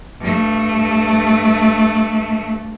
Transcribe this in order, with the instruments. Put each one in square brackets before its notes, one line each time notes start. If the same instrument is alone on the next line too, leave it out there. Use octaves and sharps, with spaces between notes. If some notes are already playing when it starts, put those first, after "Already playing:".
[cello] G2 A3